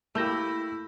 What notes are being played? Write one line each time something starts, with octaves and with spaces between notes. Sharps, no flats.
A3 A#3 E4 G4 B5 E6 G6 A#6